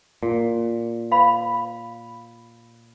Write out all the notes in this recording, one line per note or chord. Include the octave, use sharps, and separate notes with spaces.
A#2
F5 B5